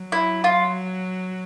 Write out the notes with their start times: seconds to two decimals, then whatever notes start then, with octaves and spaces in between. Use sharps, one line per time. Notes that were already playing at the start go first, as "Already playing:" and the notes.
Already playing: F#3
0.12 E4
0.44 F4